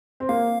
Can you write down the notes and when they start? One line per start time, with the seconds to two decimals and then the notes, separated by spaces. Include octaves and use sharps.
0.20 C4
0.29 A#3 F5